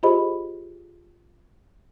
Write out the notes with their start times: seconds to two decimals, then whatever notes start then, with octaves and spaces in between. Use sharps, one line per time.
0.03 F4 G4 G#4 C5 D#5 B5